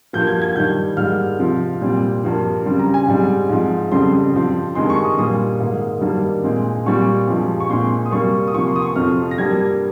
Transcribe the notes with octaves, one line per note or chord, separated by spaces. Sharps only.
G2 F3 A#3 G6
G#6
G#6
G2 D#3 G3 G6
G#2 G3 A#3 F6
C3 F3 C4
A#2 G3 C4
G2 F3 A#3
C#3 G3 C4
A#5
G#5
G#2 G3 C4
G#2 F3 C4
F2 C#3 G3 C4 C6
G2 F3 C4
G2 D#3 G#3 C4 C6
C#6
D#6
A#2 G3 A#3 D#6
G#2 D#3 A#3
G2 D#3 G3 A#3
A#2 G#3 C4
A#2 G3 C4 C#6
G2 F3 G#3 C4
C#6
A#2 G#3 C4 C6
D#6
C3 G3 A#3 C#6
D#6
C3 F3 A#3 C#6
C6
D#6
C#6
F2 C3 F3 C4 F6
A#6
G2 G3 A#3 G#6